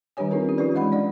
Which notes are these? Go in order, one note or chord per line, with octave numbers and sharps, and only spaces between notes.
D#3 G3 D4 G4 C#5 G#5
C4 D#4 F4 G#4 A#4 B4
C#4 G4
F3 D#4 F4 G4 B4 D5
E3 G#3 D#5 F#5 B5
D4 D5 F5